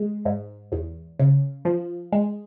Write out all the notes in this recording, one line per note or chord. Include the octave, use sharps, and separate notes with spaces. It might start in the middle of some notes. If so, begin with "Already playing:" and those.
Already playing: G#3
G#2
E2
C#3
F3
G#3